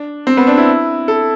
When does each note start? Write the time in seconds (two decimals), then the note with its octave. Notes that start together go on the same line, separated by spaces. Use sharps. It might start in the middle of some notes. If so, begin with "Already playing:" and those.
Already playing: D4
0.27 C4
0.37 B3
0.47 D4
0.58 E4
1.08 A4